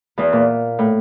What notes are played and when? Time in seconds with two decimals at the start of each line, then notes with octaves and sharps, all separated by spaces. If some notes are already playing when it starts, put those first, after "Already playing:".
0.18 E2 E3
0.33 A#2
0.79 A2